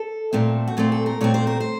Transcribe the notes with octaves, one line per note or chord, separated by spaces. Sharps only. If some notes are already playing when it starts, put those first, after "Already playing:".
Already playing: A4
A#2 A3 C4
F#4
A#2 A3 C4 F4
A4
A#4
A#2 A3 C4 C#5
C5
A#4
C5